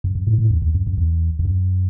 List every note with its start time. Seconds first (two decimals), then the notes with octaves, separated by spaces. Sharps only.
0.04 F#2
0.15 F#2
0.27 A2
0.38 A2
0.50 E2
0.62 E2
0.74 F#2
0.87 F#2
0.98 E2
1.39 E2
1.45 F#2